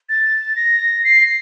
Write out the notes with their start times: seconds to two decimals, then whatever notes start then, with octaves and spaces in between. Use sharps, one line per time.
0.09 A6
0.56 A#6
1.04 C7